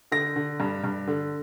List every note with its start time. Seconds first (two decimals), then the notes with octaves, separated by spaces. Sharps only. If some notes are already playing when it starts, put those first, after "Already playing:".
0.11 D3 A#6
0.36 D3
0.60 G2
0.84 G2
1.07 D3